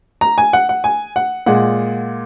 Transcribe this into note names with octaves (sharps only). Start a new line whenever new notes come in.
A#5
G#5
F#5
F#5
G#5
F#5
A#2 G#3 F#5